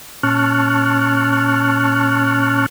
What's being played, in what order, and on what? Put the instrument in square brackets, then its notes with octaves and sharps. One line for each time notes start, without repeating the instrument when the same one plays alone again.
[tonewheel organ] A#2 C#4 A5 C#6 F6 F#6